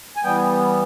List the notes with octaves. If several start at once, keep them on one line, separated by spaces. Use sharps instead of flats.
G#5
E3 G3 B3 G5